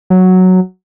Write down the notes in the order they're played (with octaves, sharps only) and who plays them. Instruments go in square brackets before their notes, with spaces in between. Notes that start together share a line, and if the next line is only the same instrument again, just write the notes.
[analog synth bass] F#3